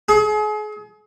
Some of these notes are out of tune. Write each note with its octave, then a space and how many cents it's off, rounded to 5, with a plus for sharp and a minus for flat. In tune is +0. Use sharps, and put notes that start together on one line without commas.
G#4 +35